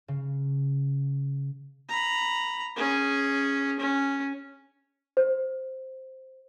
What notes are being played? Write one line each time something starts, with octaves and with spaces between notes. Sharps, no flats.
C#3
A#5 B5
C#4 G#4
C#4
C5